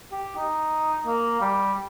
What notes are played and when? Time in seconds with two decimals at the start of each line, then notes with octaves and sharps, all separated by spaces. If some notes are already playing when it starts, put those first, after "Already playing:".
0.12 G4
0.36 D#4
1.06 A#3
1.41 G3